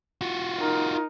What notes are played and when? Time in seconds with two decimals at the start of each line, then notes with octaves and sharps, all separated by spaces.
0.21 F4 F#4
0.59 D#4 A#4